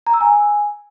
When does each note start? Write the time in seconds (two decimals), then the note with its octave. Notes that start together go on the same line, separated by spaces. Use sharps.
0.07 A#5
0.14 E6
0.21 G#5